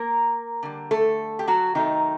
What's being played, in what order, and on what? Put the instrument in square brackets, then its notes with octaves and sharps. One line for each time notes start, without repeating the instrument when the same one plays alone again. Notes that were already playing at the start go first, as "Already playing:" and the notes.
Already playing: [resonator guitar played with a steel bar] A#3 A#4
D3 G3
A3 A4
G4
F#3 F#4
C3 D#3 F#3 A3 D#4